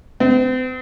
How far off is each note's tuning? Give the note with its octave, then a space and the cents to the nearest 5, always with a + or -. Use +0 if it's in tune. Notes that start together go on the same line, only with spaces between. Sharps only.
C4 -40